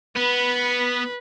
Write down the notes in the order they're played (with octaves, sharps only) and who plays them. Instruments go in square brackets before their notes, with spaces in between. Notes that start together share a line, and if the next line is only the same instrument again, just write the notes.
[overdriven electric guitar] B3 [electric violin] B4